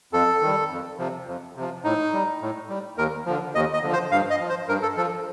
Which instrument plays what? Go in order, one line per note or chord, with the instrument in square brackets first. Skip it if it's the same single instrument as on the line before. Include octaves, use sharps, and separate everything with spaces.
[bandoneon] F2 A4
D#3 G3
F2
C3 F3
F2
C3 F3
A2 D#4
G3
A2
G3
D#2 A#4
D3 F3
D#2 D#5
D#5
D3 F3
C5
G2 F5
D#5
F3
C5
G2 A#4
A4
F3 A4